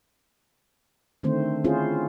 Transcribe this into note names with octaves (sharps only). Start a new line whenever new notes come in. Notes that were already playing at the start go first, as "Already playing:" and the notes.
D3 D#3 A3 C4 C5
C4 C#4 E4 F4 G#4 C5